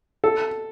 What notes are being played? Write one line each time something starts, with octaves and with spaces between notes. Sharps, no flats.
A4